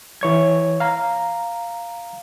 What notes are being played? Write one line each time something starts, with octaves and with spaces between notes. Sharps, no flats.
E3 C#5 G#6
F5 A#5